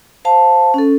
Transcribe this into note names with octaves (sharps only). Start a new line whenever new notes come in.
C5 F5 A5
C#4 A4